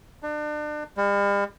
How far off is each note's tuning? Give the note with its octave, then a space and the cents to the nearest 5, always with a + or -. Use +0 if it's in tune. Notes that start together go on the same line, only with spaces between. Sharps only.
D4 +35
G3 +45